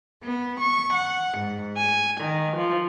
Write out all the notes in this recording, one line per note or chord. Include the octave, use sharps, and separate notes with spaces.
B3
C#6
F#5
G#2
G#5
D#3
F3